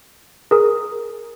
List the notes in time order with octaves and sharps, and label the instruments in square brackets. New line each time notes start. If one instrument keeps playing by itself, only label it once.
[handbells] G#4 A#4 D#6